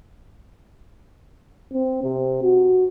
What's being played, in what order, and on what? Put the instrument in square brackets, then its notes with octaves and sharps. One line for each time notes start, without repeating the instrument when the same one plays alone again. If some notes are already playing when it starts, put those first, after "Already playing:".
[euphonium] C4
C3
F#4